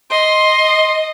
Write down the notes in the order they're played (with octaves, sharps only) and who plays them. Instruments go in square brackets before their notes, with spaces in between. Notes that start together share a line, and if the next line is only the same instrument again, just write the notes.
[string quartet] D#5 [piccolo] C6